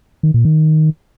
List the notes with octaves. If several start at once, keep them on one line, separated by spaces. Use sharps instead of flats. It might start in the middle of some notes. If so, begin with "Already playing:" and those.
D#3
A#2
D#3